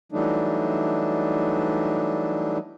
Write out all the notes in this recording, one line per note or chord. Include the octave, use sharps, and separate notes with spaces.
E3 F#3 G3 A3 D4 D#4